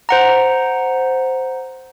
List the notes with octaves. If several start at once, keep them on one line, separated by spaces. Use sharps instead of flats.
C5 F#5 A#5